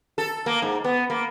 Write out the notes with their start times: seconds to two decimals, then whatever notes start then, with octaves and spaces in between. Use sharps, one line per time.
0.18 A4
0.46 A#3
0.62 G#2
0.84 B3
1.10 A#3